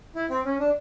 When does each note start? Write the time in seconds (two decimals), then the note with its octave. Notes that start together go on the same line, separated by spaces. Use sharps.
0.15 E4
0.30 C4
0.45 C#4
0.59 D4